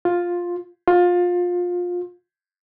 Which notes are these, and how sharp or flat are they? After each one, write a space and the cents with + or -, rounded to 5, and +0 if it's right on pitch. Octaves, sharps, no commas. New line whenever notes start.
F4 +10
F4 +25